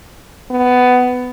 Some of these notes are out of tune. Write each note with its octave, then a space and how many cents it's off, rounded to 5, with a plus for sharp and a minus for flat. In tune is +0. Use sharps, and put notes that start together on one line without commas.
B3 +15